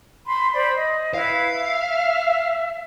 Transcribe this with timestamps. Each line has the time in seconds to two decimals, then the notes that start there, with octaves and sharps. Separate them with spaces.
0.25 B5 C6
0.54 C5 D5 B5
0.75 D#5
1.14 E4 B4 F5
1.51 E5